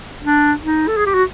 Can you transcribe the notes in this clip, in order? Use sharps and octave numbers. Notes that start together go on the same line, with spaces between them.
D4
D#4
A4
G#4
G4
F#4